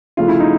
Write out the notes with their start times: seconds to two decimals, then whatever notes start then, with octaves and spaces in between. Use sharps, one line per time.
0.17 C#3 F3 A3 F4
0.28 E4
0.40 D#4